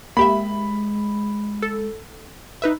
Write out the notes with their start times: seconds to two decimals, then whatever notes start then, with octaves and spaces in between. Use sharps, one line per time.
0.17 G#3 A#3 G4 E5 B5
1.62 A4
2.62 D#4 B4 E5